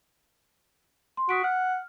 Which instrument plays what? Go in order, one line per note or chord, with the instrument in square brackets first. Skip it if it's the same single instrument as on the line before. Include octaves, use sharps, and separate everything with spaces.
[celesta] C6
[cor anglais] F#4 [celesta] D#6 B6 D7
[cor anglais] F#5 [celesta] F6